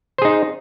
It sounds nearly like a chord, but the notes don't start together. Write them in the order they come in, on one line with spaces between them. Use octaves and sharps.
C5 G#4 D#4